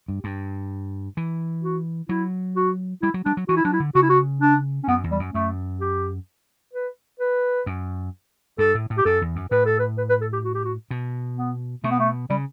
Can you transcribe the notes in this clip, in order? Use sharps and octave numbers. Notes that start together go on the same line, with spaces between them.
G2
G2
E3
F#4
F#3 E4
F#4
G3 E4
F#3
G3 D4
F#3
E3 F#4
E4
F#3 D4
E4
D3
C#3 F#4
E4
F#4
D4
C#4
F#2 B3
E2
G3
F#2
F#2 A3
G4
B4
B4
F#2
G2 A4
A2
A2
G4
F#2 A4
E2
F#2
A2 B4
A4
B4
B4
B4
A4
G4
F#4
G4
F#4
B2
B3
B2 A3
B3
A3
C#3 G3